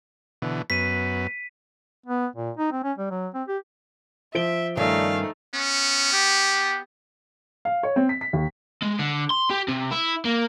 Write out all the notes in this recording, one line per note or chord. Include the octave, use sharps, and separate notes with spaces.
B2 D3 E3
F#2 B3 B6 D#7
B3
A#2
D#4
C4
C#4
G3
F#3
C4
G4
F3 E5 D7 G7
G2 D#3 A3 C#4 D#4 F5
B3 C#4
G4
F5
C#5
C4
B6
B6
D#2
G#3
D3
C6
G4
C3
E4
A#3